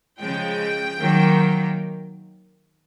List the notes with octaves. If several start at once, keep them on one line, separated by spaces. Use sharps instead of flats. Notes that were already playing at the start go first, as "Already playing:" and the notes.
C#3 F3 G#3 G5
D#3 F#3 A#3